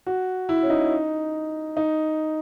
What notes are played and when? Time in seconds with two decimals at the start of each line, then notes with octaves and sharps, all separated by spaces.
0.06 F#4
0.49 E4
0.63 C#4
0.70 D#4
1.77 D#4